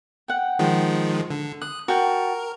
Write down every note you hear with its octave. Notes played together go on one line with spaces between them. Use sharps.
F#5 G5
D#3 F3 G#3
D3
D#6 F#6
F#4 A#4 G5 A5